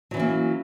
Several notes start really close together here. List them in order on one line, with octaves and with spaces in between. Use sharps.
F#3 E3 C#4 A#3